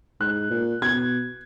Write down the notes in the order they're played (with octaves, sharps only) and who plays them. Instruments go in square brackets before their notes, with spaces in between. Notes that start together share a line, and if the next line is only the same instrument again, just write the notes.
[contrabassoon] G#2 [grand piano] F#6
[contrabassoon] A#2
[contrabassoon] B2 [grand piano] G#6